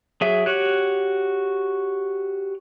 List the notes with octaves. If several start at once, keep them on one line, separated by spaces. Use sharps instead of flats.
F#3 G#4 E5
F#4 G4 C#5 F#6